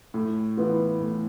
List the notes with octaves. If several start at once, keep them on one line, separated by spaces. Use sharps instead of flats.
A2
E3 B3 F4
A2